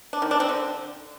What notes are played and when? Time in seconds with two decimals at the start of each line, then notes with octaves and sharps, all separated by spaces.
0.13 D4
0.22 D#3
0.31 D4
0.40 C4
0.49 D3